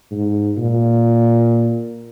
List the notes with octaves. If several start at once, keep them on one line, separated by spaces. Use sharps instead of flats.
G#2
A#2